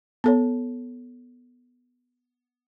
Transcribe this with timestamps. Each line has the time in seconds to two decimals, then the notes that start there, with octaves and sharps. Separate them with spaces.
0.24 B3 A4 C#5